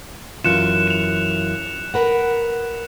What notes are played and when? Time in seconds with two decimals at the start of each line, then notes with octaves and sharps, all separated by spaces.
0.44 F#2 E3 F4 F#6 C#7 E7
0.88 E7 F7
1.94 A#4 B4 F#5